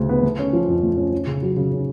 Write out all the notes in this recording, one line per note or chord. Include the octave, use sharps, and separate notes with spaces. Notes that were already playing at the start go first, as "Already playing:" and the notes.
Already playing: D2 C#3
B3
A3
C#4
F3
F2
A3
C#4
C#4
C#3
F#3
C#3
C#4